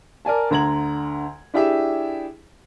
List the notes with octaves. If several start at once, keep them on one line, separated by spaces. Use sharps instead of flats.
A#4 D5 G#5 A5
D2 D3 A#5 G#6 F#7
D4 E4 G4 G#4 E5